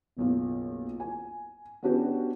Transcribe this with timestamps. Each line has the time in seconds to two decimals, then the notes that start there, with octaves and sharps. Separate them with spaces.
0.17 F#1 B1 F4
1.00 G#5
1.83 B3 C#4 D4 F#4 G4 B4